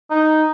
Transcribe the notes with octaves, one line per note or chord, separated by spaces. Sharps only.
D#4